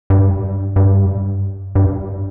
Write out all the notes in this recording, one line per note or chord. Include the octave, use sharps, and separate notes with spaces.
G2
G2
G2